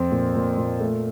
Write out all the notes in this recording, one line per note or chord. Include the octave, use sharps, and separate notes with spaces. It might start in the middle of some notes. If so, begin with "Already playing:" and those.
Already playing: F2 C4
A#2
A#2
A#2
A3